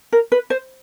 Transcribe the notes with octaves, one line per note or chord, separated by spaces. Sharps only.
A#4
B4
C5